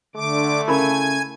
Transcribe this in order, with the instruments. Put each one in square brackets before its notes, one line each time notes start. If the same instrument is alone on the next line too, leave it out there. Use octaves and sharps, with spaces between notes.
[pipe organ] D3 D6 [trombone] A3
[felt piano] C#3 [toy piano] E4 A#4 B5 [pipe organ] G#5 G#6